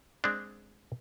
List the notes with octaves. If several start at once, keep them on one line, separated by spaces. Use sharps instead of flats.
G#3 C4 D4